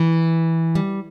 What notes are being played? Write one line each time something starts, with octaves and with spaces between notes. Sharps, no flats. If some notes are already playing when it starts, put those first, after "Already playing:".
Already playing: E3
G3